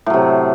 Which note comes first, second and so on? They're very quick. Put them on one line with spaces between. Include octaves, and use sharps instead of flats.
A2 F#3 C3